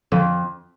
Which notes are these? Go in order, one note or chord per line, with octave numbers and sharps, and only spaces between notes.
F2 D3 F3